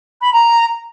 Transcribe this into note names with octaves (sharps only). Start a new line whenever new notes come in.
B5
A#5